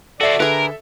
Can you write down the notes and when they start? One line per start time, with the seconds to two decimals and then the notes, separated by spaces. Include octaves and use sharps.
0.21 F#4 A4 C5 D5 E5
0.40 D3 G#4 A#4 B4